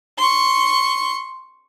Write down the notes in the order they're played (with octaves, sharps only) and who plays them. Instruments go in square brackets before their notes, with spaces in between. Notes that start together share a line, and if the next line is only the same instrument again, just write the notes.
[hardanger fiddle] C6 C#6